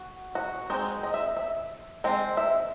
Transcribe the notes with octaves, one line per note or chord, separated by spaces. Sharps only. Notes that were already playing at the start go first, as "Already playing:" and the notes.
Already playing: F#4
F#4
G#3 C4 D#4
D#5
E5
E5
G#3 C4
E5